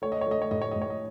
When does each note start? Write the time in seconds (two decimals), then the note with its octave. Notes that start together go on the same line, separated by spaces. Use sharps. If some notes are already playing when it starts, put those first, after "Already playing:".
0.02 A3 C#5
0.12 D#5
0.21 C#5
0.26 A3 D#5
0.42 C#5
0.51 A2 D#5
0.62 C#5
0.71 A2 D#5
0.82 C#5
0.90 D#5